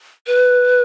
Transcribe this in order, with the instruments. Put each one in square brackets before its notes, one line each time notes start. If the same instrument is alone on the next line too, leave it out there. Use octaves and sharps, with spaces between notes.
[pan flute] B4